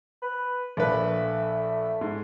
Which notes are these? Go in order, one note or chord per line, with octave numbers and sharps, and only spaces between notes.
B4
A#1 A3 B4
G#2